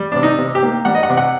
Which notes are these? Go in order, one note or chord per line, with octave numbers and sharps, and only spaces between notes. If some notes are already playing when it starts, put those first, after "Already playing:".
Already playing: G3
C3 D4
D#4
C3
G4
A#3
G3 F#5
D#5
F#5
C3
F#5